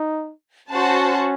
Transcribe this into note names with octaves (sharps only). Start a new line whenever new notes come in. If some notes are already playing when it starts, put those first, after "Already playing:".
Already playing: D#4
C#4 F#4 C5 F#5 A5